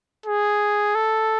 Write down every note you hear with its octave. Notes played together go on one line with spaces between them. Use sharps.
G#4
A4